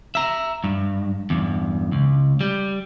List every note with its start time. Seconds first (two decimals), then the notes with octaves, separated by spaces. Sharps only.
0.15 E5 A#5
0.64 G2
1.30 E2 G2
1.92 C#2
2.41 G3